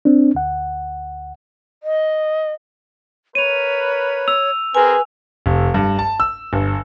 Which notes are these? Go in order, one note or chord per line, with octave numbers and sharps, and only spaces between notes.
C4 D4
D2 F#5
D#5
A#4 B4 C#5 D#7 F7
E6 F7
C4 G#4 A#4 B4 G#5
F1
G2
A5
E6
G1